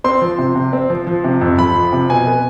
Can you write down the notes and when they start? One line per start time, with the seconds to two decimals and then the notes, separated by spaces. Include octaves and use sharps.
0.04 C4 C6
0.21 F3
0.38 C3
0.56 C3
0.73 C4
0.90 F3
1.07 F3
1.24 C3
1.41 F2
1.58 F2 B5
1.76 F3
1.93 C3
2.10 B2 G#5
2.27 B3